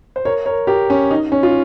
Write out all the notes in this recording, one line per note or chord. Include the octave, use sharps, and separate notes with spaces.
C5
A#4 C#5
A#4 C#5
G4 A#4
C#4
D#4
C#4
F4